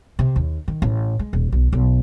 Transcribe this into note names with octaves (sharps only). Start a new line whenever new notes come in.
C3
D#2
D#3
A1
G#3
D#1
B1
B1